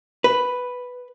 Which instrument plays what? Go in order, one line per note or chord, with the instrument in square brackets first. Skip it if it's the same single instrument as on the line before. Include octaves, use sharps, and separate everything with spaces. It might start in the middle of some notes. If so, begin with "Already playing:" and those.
[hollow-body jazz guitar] B4